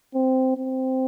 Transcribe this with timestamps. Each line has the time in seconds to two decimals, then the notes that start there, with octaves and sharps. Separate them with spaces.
0.14 C4
0.58 C4